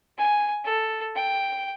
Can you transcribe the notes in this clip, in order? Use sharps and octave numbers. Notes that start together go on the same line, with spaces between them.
G#5
A4
G5